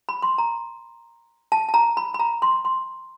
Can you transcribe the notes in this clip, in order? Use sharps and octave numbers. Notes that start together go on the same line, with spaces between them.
B5
C6
A#5
A5
A5
A#5
B5
B5
A#5
C6
C6